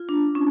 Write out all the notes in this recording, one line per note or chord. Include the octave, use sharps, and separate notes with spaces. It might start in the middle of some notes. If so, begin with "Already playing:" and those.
Already playing: F4
D4
C#4